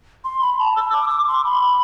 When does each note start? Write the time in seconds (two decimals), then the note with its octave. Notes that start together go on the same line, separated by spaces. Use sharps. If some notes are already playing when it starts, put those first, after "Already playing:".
0.24 C6
0.41 B5
0.59 A5
0.76 E6
0.93 D6
1.10 D6
1.28 C6
1.44 B5